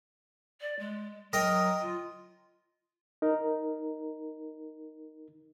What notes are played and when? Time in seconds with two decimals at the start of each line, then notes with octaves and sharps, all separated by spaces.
0.61 D5
0.79 G#3
1.33 F#3 A#4 D#5 G5
1.81 F4
3.22 D#4 A#4